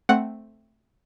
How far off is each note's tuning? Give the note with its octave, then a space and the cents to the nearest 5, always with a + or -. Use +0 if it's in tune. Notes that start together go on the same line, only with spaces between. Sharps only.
A3 +0 C4 +5 F#5 +0